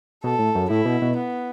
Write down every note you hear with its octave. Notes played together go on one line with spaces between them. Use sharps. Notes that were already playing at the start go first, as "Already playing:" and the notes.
B2 A4
A2
F#2
A2 E4
B2
B2
B3